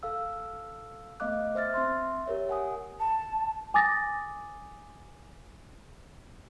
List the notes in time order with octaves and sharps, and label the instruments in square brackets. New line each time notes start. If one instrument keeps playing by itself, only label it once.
[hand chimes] A4 F5 E6
A3 B3 D#5 F5 D6 F#6
C5 E5 F6 A6
C4 E5 C6
G4 A#4 C#5 E5
F#5 G#5 D#6
[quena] A5
[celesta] G#5 D6 D#6 A6 A#6